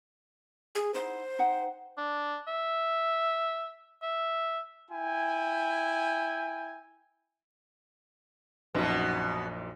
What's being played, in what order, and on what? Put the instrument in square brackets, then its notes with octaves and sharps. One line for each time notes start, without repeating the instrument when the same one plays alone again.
[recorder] G#4
[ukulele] D#4 E4 F#5 [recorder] C5
[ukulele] D#4 F#5 G5
[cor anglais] D4
E5
E5
[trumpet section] E4 G5 G#5
[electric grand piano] A#1 F#2 D#4 [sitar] B2 B3